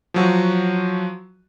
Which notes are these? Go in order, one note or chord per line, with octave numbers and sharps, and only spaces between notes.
F3 F#3 F#4